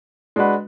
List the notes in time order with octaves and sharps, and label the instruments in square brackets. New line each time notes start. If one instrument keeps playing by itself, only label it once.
[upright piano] G#3 D4 F#4 B4